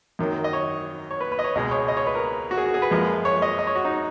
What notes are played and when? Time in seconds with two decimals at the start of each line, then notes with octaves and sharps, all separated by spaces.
0.19 F#2 D#3 F#3
0.44 D#5
0.53 C#5
1.11 C#5
1.21 B4
1.32 B4
1.39 D#5
1.44 C#5
1.55 C#2 B2 G#3 D#5
1.71 C#5
1.88 D#5
1.97 C#5
2.07 B4
2.15 A#4
2.51 F#4
2.58 G#4
2.66 F#4
2.74 G#4
2.82 B4
2.91 F#2 F3 G#3
3.25 C#5
3.42 D#5
3.59 D#5
3.67 C#5
3.76 F#4
3.85 D#4